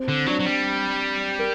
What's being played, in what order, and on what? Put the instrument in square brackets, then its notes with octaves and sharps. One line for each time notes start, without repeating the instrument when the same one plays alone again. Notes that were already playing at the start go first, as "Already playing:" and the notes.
Already playing: [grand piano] C4
[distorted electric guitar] D3
[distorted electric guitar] F#3 [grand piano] D4
[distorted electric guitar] F#3
G3
[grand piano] A#4